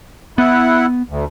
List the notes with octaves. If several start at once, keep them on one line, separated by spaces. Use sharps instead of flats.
B3 E4 F#5
D2